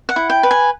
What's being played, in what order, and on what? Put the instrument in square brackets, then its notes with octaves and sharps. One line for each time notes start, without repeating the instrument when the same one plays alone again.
[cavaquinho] F#5
E4
G5
B4
G#5